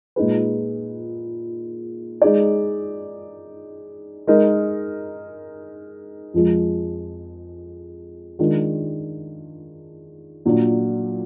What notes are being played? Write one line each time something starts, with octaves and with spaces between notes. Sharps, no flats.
A#2 G#3 D#4 G#4 B4
G#3 D#4 G#4 D5
G#3 D#4 A#4
F2 F3 G#3
D#3 G#3 D4 F4
A#2 F#3 D4